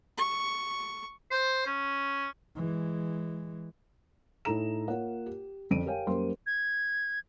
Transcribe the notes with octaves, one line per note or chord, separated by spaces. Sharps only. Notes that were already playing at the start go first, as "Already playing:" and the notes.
C#6
C5
C#4
E3 G#3
A2 D#4 E4 A4 A#5 E7
A#3 F4 A#4 C#5 F#5
G4
F2 D3 D7 D#7
G4 A#4 C#5 F5 G5 G#5
F#2 G3 A#3 A#4 C5 C6
G#6